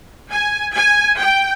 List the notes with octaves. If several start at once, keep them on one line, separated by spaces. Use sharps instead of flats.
G#5
G#5
G5